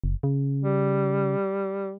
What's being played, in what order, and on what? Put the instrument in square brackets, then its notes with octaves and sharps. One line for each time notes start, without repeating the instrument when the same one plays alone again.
[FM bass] F#1
C#3
[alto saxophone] G3